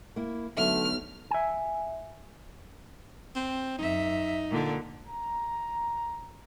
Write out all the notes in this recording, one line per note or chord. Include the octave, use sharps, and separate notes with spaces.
A#3 E4
B1 D3 F#3 A3 E5 F6
E5 G#5
C4
F#2 D#4 E5
A#2 D3
A#5